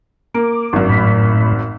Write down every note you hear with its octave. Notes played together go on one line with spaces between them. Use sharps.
A#3 D6
G#1 F#2
A2 B5